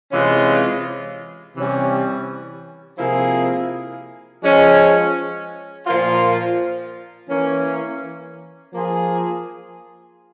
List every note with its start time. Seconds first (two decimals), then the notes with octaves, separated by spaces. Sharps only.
0.12 C3 E3 G#3 C#4 F4
1.55 C3 E3 G3 C#4 G4
2.98 C3 F3 A#3 E4 G#4
4.42 F3 G#3 C#4
5.86 A#2 F3 A#3 F4
7.28 E3 A#3 C#4
8.72 F3 A#3 F4 G#4